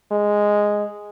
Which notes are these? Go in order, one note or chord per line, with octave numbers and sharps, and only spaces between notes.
G#3